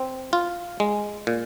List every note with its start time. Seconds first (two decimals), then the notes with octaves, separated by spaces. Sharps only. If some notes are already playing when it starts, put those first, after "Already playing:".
Already playing: C4
0.33 F4
0.80 G#3
1.27 A#2